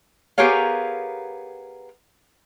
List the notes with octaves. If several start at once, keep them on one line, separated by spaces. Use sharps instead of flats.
B3 G4 G#4 A#4 C#5 F5